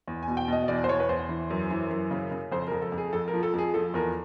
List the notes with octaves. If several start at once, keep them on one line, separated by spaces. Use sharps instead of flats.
E2
G#5
B2
G5
B2 D#5
D#5
E2 D5
C5
E2 C#5
B4
E2 C5
E3
F#2
E3
F#2
C#3
C#3
F2 C5
F2 A#4
A4
F2
G#4
F2 A4
A#4
F3
A4
F2 G#4
F3 A4
E2 A#4